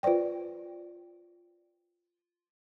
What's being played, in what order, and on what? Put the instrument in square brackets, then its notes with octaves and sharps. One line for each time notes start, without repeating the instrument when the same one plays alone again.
[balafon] F4 B4 C5 D5 G5